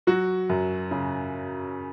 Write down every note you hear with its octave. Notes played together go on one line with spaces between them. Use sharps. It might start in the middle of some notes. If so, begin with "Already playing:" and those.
F#3 F#4
F#2
C#3